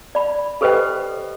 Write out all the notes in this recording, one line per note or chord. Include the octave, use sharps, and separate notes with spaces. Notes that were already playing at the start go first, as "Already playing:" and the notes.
D5 B5
G4 A4 B4 C5 D#5 G5